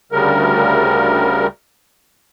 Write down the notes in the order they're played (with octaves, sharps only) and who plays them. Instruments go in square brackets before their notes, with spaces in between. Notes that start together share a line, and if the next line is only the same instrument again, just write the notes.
[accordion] D2 C#3 G3 A#4